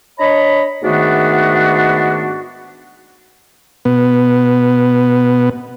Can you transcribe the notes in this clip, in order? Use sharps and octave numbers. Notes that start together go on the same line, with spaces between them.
D4 C#5 D#5 A#5 B5
G#2 D#3 A3 B3 D4 F#4
B2 B3